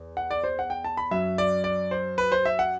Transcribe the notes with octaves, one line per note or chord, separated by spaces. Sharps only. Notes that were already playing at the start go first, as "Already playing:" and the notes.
Already playing: E2
F#5
D5
C5
F#5
G5
A5
B5
F#2 F#3 E5
D5
D5
C5
B4
C5
E5
F#5